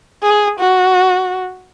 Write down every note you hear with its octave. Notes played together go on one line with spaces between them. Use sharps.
G#4
F#4